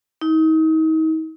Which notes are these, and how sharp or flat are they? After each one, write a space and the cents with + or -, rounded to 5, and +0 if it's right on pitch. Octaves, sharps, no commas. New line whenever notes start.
D#4 +35